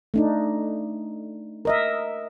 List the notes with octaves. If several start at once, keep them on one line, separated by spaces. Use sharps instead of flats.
A3 D4 D#4
A#4 D#5 E5